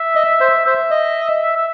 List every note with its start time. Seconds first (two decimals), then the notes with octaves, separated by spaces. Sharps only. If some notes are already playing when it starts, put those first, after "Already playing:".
Already playing: E5
0.16 D#5
0.40 C5
0.66 C5 E5
0.91 D#5
1.57 E5